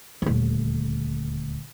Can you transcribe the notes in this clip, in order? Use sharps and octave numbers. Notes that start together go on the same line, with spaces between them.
D#1 D2